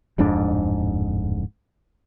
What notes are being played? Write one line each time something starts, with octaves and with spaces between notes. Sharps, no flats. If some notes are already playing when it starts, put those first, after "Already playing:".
D1 F2 G#2 D4